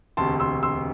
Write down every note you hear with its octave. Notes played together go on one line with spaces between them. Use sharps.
E1 D2 C3 A5 C6
C6 E6
C6 E6